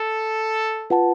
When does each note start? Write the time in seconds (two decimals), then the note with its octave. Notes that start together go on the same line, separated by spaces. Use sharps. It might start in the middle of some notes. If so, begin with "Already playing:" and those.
Already playing: A4
0.90 F4 B4 F#5 A5